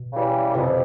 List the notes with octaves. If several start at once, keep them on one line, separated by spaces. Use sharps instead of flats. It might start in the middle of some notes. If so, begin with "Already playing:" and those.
Already playing: B2
C#3 E3 G3
F2 C3